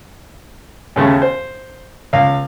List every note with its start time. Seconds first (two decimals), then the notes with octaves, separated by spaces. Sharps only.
0.96 D#2 C#3 A3
1.22 C5
2.13 C#2 F5